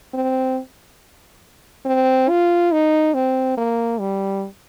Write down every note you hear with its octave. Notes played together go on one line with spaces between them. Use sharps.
C4
C4
F4
D#4
C4
A#3
G3